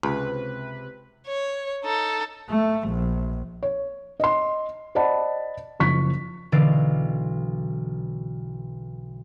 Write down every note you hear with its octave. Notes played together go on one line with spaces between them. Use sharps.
C#2 C3 B4
C#5
D#4 A4
A3
A#1
C#5
D#5 C6
C5 D5 D#5 F#5 A5 B5
F#1 F3 C#6 B6
B1 D3 E3 D5 F5